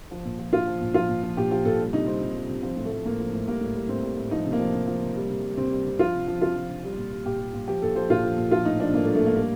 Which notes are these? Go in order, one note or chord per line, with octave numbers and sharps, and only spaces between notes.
F3
A#2
F3
A#2 F4
F3
A#2
F3 F4
A#2
F3
A#2 G4
F3 G4
A#2 A4
G3
C3 D#4
G3 C4
C3
G3
C3
F3 C4
A2
A3
F3
A2 A#3
F3
A2
G3 A#3
A2
G3
A2 C4
G3
A2
F3 D#4
C3
A#3
F3
C3
F3
C3
G3
C3
G3
C3 C4
G3
C3
F3 F4
C3
F3
C3 F4
F3
C3
G3
A#2
G3
A#2 G4
G3
A#2
F3 G4
A#2 A4
F3 C5
A#2 F4
F3
A#2
F3 F4
A2 D#4
F3 D4
A2 A#3
A3
F3
A3
A2 A#3
G3 A#3